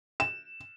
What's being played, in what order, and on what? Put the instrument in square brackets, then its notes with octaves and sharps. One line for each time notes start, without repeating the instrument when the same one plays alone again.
[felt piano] E7